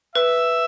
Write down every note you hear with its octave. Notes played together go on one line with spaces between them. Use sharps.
B4 E5